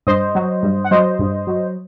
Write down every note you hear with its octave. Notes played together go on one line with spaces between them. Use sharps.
G2 C5 D#5
F#3
G2
F#5
F#3 C5 D#5
G2
F#3